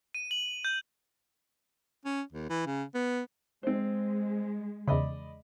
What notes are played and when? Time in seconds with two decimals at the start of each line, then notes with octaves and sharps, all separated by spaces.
0.14 D#7
0.31 F#7
0.65 G6
2.05 C#4
2.33 D#2
2.49 E3
2.66 C#3
2.94 B3
3.63 G#3 C4 C5
4.88 E2 C#3 D5 D#5 B5